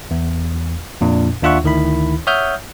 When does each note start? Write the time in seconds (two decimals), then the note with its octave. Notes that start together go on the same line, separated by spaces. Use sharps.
0.11 E2
1.01 F2 A#2 D4
1.42 D#2 D4 F4 E5 F#5 C#6
1.64 D2 D#3 E4 B5
2.27 C#5 E5 F#5 D#6 F6 G6